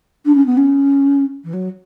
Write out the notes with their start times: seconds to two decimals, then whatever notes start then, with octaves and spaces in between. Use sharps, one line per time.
0.25 D4
0.35 C#4
0.46 B3
0.57 C#4
1.44 E3
1.53 F#3